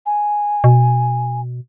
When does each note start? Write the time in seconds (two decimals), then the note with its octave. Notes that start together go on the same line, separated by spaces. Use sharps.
0.06 G#5
0.64 B2